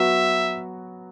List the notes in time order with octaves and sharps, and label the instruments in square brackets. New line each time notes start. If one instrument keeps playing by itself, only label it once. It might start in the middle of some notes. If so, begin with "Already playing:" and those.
Already playing: [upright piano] F#3 B3 F#4 [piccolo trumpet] E5